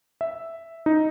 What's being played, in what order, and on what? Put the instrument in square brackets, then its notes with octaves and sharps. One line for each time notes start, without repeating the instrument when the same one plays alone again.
[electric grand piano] E5
D#4